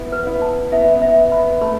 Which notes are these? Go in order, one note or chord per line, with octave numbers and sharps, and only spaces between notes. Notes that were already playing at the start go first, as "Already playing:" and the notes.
Already playing: B3 E4
B4
B3 E4
A5
B3 E4 E5
B3
E5
B5
B3
A3 B5